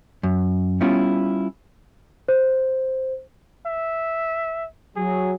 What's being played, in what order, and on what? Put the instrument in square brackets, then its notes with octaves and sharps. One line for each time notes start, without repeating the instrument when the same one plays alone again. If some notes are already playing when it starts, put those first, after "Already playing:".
[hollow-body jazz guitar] F#2
G3 B3 C#4 E4 F4
[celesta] C5
[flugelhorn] E5
[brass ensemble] F#3 [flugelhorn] G#4